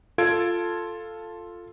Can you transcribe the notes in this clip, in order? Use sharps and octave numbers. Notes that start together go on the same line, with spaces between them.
F4 A4 G#6 D7